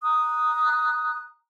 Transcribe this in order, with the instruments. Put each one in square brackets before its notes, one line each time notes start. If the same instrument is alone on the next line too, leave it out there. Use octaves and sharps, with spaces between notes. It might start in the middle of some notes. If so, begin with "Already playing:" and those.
[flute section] A#5 D#6 F#6